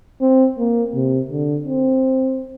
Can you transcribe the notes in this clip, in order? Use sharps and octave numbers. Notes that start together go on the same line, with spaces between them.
C4
A#3
C3
D3
C4